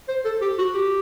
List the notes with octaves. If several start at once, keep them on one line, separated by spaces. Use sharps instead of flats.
C5
A4
G4
F#4
G4